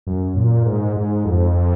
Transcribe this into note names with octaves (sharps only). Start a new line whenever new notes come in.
F#2
A#2
G#2
G#2
F2